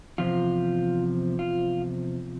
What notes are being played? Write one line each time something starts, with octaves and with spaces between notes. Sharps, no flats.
E2 C3 F3 F4
F4